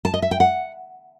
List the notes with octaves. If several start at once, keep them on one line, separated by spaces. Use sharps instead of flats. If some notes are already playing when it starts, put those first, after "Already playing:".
A5
D#5
E5
G5
F#5